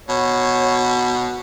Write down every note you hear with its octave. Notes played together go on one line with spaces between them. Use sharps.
B2 C#5